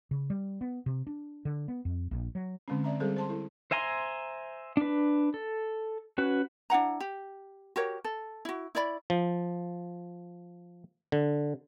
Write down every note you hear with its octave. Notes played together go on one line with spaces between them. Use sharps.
C#3
G3
B3
C3
D4
D3
B3
F2
A#1
F#3
D3 G#3 C4 C#4
C4 D5 E5 A#5
G3 C4 G#4 A4 C5
C5 A5 C6
E4 A4
C5 E5 G#5 A#5 C6
D4 B4
A4
C#4 F#4 B4
D4 E4 F#5 A#5
G4
F#4 G4 A#4 C#5
A4
E4 F#4
E4 C#5 D5 B5
F3
D3